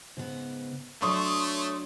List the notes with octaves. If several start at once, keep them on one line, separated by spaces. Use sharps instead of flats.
G#2 C#3 B3
F#3 A3 D4 C#5 C6 C#6 D#6